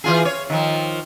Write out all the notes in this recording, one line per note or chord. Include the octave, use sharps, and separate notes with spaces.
E3 F4 G#4
C#5
D#3 F3